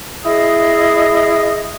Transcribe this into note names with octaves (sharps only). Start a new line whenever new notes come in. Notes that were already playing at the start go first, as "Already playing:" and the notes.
E4 G#4 D#5